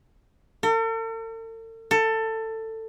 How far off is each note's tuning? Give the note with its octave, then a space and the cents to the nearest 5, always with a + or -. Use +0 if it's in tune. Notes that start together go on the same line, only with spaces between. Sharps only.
A4 +45
A4 +20